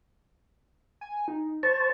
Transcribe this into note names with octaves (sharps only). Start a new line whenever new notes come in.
G#5
D#4
C5 A5 C#6